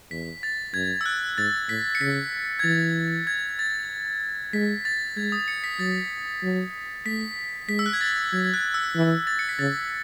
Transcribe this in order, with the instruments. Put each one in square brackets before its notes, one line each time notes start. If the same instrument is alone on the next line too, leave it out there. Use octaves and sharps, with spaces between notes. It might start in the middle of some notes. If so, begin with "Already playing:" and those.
[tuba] E2 [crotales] B6
[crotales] A6
[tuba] F#2 [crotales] G#6
[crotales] E6
F#6
[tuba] G#2 [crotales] A6
[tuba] A2 [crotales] B6
[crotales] C#7
[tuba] C#3 [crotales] B6
[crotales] G#6
[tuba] E3 [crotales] A6
[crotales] G#6
A6
[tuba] G#3 [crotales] B6
[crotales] A6
[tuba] G#3 [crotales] G#6
[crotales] D#6
C#7
B6
[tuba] F#3 [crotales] A6
[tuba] F#3
[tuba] A3 [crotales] B6
[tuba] G#3 [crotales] B6
[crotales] E6
F#6
G#6
A6
[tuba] F#3 [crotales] G#6
[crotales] G#6
F#6
E6
[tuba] E3
[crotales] A6
C#7
B6
[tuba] C#3 [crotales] A6